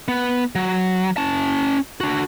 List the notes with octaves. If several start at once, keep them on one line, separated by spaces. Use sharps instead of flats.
B3
F#3
C#4 A5
D4 F#4